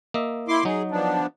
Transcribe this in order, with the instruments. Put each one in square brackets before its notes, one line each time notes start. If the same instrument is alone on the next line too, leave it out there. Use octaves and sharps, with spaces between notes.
[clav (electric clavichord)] A#3 D#5 E5
[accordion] E4 C6 D6
[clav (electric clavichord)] F#3 D#4 [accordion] G#4
[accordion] F3 B3 D4